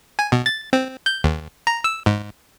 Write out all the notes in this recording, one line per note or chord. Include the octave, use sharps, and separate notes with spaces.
G#5
B2
A6
C4
G6
D#2
A#5
E6
G#2